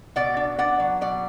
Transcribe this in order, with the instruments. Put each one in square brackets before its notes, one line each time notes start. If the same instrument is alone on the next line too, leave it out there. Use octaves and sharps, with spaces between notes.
[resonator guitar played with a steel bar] B2 D5 F#5
D4
B3 D5 F#5
F#3
B2 D5 F#5